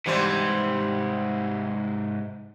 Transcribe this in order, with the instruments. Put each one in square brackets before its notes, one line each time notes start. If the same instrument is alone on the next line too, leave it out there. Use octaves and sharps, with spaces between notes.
[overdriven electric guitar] G#2 C3 [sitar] E3 G3 C5